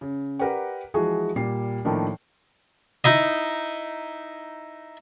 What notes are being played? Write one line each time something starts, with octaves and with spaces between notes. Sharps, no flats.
C#3
G4 A#4 B4 D5 F#5
E3 F3 G#3 F#4 G#4
A#2 G3 C7
A2 D#3 F3 A#3 D4
D#4 E4 D#5